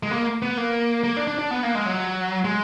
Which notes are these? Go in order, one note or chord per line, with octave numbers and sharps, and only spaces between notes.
G#3
A#3
B3
A#3
A#3
D4
D4
D4
B3
A#3
G#3
F#3
G#3